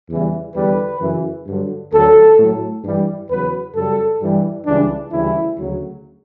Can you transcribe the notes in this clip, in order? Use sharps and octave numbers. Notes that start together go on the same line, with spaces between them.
E2 C#3 E3 G3
E2 D3 G3 B4
F#2 C#3 E3
G2 D3 F#3
D2 D3 F#3 A4
A2 F#3
G2 E3 G3
E2 C#3 F#3 B4
F#2 C#3 G3 A4
G2 E3 G3
C#2 C#3 E3 G3 D4
D2 C#3 E3 G3 E4
D2 C#3 F#3